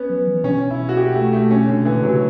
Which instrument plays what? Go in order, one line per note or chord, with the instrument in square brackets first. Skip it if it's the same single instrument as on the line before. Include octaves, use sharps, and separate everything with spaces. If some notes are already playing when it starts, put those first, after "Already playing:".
Already playing: [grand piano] B3 C#4
[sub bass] F#3
E3
[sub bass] B2 [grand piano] C#4
[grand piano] E4
F#4
G4
A3
A3
C#4
D3
E3
[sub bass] B2
[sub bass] C#3 [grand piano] F#3